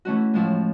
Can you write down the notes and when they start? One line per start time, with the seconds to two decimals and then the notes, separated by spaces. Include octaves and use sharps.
0.05 E3 A3 C#4 F#4
0.33 A2 F3 G#3